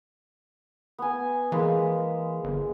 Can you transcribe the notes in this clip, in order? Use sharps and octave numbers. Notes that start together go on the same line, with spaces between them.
B3 G#5
E3 G#3 A#3 B4
G1